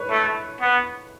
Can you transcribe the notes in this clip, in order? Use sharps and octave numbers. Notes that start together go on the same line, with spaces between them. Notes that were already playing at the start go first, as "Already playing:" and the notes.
Already playing: B4 C#5
A3
B3